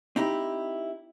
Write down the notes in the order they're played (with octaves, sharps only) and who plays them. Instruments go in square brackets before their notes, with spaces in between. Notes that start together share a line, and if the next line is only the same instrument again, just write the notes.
[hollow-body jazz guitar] C4 D#4 E4 G4